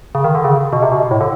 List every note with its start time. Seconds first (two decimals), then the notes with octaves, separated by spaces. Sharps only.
0.15 C#3
0.24 D#3
0.35 D3
0.44 C#3
0.73 B2
0.83 C3
0.92 B2
1.11 A2
1.21 D3